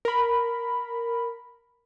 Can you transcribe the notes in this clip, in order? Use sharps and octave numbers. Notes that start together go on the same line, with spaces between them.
A#4 B5